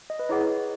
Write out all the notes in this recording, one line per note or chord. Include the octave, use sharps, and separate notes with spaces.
D#5
B4
E4 G#4 C#5 D#5 F#5